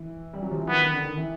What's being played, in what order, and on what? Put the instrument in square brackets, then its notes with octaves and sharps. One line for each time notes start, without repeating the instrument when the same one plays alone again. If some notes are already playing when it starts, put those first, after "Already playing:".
Already playing: [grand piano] E3
G3
F#3
F3
E3
[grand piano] D#3 [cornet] B3
[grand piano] D#3
D3
D#3
E3